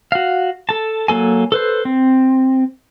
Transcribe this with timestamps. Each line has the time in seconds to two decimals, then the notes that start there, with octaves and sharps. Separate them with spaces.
0.12 F#4 F5
0.69 A4 A5
1.08 F#3 A#3 A4 G#5
1.52 A4 B4 C5
1.85 C4